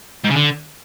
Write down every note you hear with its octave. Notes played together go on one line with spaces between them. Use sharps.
G#2
C#3
D3